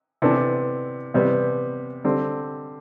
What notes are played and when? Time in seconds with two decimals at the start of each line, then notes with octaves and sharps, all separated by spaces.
0.22 C3 E3 B3 D4 A4
1.14 E2 C3 G3 B3
2.04 D3 G3 C4